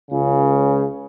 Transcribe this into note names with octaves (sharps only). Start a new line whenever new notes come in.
C#2 C#3